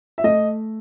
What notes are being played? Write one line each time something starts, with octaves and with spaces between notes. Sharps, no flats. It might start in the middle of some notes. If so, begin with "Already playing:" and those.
E5
A3 D#5